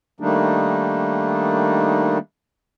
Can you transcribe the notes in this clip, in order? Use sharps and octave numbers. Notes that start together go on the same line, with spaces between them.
D#3 G3 A3 A#3 D4 D#4